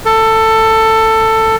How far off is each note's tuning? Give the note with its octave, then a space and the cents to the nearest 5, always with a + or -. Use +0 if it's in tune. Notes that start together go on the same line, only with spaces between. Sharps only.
A4 +15